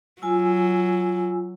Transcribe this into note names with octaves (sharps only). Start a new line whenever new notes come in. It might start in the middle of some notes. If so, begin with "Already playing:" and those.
F#3 F4 G#5 E6